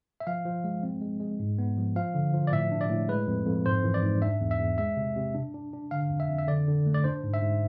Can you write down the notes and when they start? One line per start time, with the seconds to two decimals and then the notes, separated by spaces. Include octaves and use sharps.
0.20 E5
0.27 F3 F5
0.45 F3
0.64 G#3
0.83 C4
1.01 G#3
1.20 G#3
1.39 G#2
1.58 B3
1.78 F3
1.96 F3 F5
2.14 D3
2.34 F3
2.47 D5
2.52 A2 E5
2.72 D4
2.81 D5
2.90 A2
3.08 G#3 B4
3.27 F2
3.46 F2
3.66 G#2 C5
3.84 E3
3.94 D5
4.03 G#2
4.22 D4 E5
4.41 E2
4.51 E5
4.60 E2
4.78 G#3 E5
4.97 C3
5.16 C3
5.34 D4
5.54 D4
5.73 D4
5.91 D3 F5
6.10 F2
6.20 E5
6.29 F2
6.38 E5
6.48 D3 D5
6.68 D3
6.86 A3
6.94 D5
7.04 D4 C5
7.24 G#2
7.34 E5
7.42 G#2